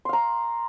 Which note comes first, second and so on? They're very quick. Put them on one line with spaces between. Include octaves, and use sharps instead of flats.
C6 F5 A#5